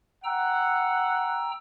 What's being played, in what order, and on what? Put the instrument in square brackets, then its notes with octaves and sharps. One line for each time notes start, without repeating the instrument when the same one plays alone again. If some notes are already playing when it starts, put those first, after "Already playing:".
[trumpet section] F#5 [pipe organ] G5 A#5 E6